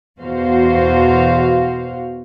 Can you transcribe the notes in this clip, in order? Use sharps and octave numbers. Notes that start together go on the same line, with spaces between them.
E2 B2 F#4 C5 F5